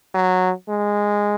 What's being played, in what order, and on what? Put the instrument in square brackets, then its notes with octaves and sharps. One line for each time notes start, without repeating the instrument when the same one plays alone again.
[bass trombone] F#3
G#3